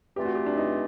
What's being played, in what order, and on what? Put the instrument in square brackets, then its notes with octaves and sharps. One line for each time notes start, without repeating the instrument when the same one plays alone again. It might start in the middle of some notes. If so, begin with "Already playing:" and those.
[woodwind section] G2 E3 A3 C4 F4 [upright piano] G4
[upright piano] F#4
G4
D4
D#4